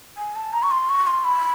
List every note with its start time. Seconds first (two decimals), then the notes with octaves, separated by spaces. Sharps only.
0.17 G#5
0.36 A5
0.53 A#5
0.63 C#6
0.71 C6
0.89 C#6
1.07 C6
1.24 B5